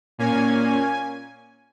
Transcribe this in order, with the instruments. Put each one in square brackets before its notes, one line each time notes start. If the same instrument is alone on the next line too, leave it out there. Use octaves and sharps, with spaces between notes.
[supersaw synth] A#2 A#3 C#4 G#5